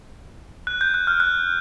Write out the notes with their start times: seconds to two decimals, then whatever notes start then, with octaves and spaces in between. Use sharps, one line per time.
0.67 F#6
0.81 G6
0.94 F#6
1.07 F6
1.20 F#6